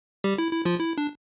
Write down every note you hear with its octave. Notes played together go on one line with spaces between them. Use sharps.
G3 G4
E4
E4
F3 F4
E4
D4